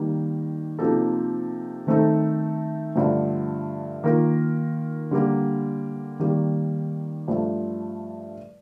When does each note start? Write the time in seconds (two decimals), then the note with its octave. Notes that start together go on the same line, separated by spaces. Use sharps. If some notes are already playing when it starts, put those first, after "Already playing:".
Already playing: D#3 G3 A#3 D#4
0.79 C3 F3 A#3 D#4 A4
1.87 D#3 A3 C4 D#4 A4
2.95 G2 D3 F3 A3
4.03 D#3 A#3 F4 A#4
5.11 D3 G3 A#3
6.19 D#3 G3 A#3
7.28 G2 F3 A3